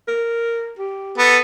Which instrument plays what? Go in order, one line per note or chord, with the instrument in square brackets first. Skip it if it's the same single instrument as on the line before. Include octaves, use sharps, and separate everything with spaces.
[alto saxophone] A#4
G4
[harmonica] B3 [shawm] A4